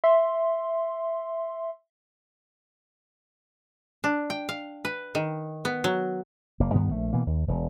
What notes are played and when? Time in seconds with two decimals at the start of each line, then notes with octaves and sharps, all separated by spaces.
0.04 E5 C6
4.04 D4
4.30 G5
4.49 F5
4.85 B4
5.15 D#3
5.65 B3
5.84 F#3
6.60 F#1 A#3
6.74 D2 G2 D#3 B3
6.91 A#1 A3
7.13 B2 E3 A#3
7.27 D#2
7.48 E1